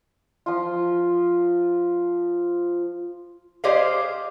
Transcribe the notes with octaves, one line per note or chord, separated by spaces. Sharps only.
F3 F4
G4 G#4 C5 D5 D#5 F5